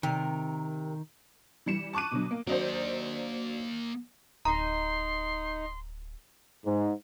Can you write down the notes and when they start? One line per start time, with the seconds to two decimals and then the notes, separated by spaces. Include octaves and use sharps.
0.03 C3 D#3 A#4
1.66 E3 G3 C#7 E7
1.93 A5 C#6 D6 F#6 D#7
2.11 B2 D3 F#3
2.31 A#3
2.47 F#3 A#3 D4 C5 D#5
4.45 D1 D#4 A#5 C6
6.65 G#2